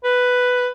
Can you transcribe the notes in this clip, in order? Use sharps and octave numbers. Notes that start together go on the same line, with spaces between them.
B4